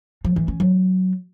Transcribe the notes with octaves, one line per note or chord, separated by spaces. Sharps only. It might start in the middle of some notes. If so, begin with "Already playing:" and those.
F3
E3
C#4
F#3